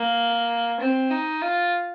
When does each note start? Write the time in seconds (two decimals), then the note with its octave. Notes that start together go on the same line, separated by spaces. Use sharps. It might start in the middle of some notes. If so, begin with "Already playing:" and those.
Already playing: A#3
0.80 C4
1.11 D#4
1.42 F4